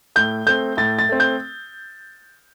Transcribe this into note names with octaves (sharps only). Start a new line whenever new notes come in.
A2 G6
A3 C4 G6
A2 A6
A6
A3 C4
G6